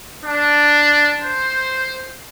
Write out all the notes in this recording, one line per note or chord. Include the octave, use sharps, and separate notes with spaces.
D4
C5